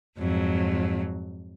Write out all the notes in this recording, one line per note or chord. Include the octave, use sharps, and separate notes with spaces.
F2 G#2 F#3